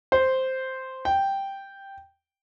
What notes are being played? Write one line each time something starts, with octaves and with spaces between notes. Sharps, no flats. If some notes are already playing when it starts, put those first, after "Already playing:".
C5
G5